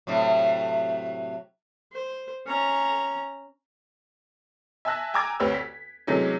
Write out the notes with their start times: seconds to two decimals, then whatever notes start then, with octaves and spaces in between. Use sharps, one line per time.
0.07 A2 C3 F#3
1.92 C5
2.46 C#4 A#5
4.85 E5 G#5 A5 E6 F#6 A#6
5.14 G5 G#5 A#5 D6 E6 G#6
5.40 D2 C4 G4 B4 C#5 E6
5.54 B6
6.07 C3 E3 F#3 G#3 A3 C#4